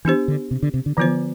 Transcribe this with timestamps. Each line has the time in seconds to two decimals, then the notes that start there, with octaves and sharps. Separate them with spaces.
0.05 E3 B3 D4 G4 C5
0.28 D3
0.51 C3
0.63 D3
0.74 C3
0.86 D3
0.97 D3 E3 F3 B3 F4 C5